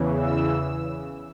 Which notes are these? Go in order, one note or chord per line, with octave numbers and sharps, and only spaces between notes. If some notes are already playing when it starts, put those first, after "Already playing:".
Already playing: E2 C#3 E3
E6